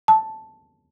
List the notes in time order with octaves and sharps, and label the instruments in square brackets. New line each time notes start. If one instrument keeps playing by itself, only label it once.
[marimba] A5